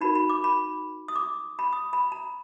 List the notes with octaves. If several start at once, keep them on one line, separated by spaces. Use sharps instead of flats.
D#4 F#4 A#4 B5
B5
D6
B5
D#6
D6
B5
D#6
B5
A#5